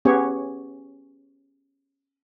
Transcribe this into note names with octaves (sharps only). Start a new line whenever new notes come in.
B3 C#4 G4 G#4 C#5